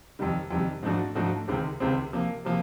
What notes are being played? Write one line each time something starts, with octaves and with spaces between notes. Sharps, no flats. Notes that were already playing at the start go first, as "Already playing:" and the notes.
F2 C3 D#3 G3
F2 C3 D#3 G3
G#2 F3 A3 D4 F#4
G#2 F3 A3 D4 F#4
C#2 C3 D#3 G#3 C4
C#2 C3 D#3 G#3 C4
C3 F3 A#3
C3 F3 A#3